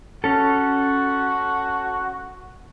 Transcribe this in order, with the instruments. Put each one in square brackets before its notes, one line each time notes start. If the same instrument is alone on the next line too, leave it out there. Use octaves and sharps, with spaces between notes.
[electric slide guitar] C#4 A4 [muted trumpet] F#4